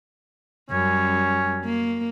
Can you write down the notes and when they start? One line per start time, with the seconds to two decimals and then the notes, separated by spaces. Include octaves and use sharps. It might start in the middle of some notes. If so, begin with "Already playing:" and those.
0.70 F#2 G3 C#4
1.64 A#3